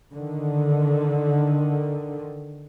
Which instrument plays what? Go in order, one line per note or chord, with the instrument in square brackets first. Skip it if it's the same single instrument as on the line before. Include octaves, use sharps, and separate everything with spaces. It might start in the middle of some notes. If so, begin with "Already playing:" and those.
[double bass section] D3 D#3